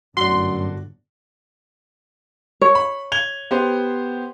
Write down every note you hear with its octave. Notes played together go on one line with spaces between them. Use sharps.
G1 F#2 A2 D3 D4 F#4 C6
C#5
B5
G#6 F7 G7
B3 G4 C5